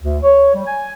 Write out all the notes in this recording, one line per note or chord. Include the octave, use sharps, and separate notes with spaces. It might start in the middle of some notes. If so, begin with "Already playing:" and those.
D2
C#5
G3
G#5